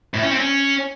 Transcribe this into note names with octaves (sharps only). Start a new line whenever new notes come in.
A2
C#4
C4
C#4